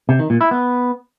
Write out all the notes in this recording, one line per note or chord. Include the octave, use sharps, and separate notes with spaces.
C3
D#3
A#2
E4
B3